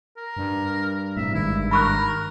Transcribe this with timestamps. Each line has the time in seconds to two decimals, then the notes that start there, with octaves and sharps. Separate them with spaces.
0.17 A#4
0.37 G2
1.17 A2 C3 E5
1.35 G#1 G#2 D#3 E4
1.71 A#4 B5 C#6 F#6